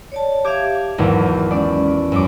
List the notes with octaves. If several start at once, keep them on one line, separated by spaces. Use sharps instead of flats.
C#5 D5 A5
G4 E5 F5 D6 G#6
G#1 E2 F#3 A#4
G#3 C#4 D5
F#2 D6